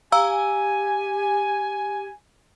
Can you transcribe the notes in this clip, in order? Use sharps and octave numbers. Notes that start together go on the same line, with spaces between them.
G4 F5 G#5 A#5 E6